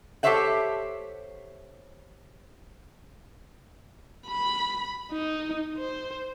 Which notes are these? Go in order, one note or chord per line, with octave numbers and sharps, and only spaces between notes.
G4 A4 C5 C#5 E5 F#5
B5
D#4
C5